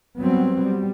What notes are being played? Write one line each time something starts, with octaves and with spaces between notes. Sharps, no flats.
F#3 G3 B3 C4
G3